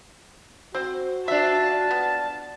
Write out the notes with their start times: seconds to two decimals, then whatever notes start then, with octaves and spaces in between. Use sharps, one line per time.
0.74 C4 F#4 C5
1.28 D4 F4 E5 A5
1.91 B3